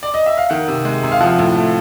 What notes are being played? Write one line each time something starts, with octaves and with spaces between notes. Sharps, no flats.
D5
D#5
E5
F5
D#3 F#5
C3
G#3
C3
F5
F3 F#5
A2
A3